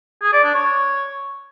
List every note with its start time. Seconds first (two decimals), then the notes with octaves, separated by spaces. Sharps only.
0.22 G#4
0.33 D5
0.43 D4
0.54 C#5